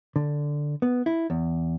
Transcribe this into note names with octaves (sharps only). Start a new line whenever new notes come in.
D3
B3
E4
E2